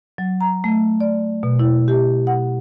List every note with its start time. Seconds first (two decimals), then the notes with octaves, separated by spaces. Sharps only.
0.18 F#3
0.41 A#5
0.64 A3
1.01 D5
1.43 B2
1.59 E4
1.88 G4
2.27 F#5